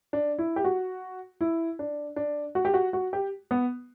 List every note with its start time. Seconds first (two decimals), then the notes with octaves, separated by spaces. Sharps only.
0.13 D4
0.39 E4
0.56 G4
0.64 F#4
1.41 E4
1.79 D4
2.16 D4
2.55 F#4
2.65 G4
2.74 F#4
2.93 F#4
3.13 G4
3.51 B3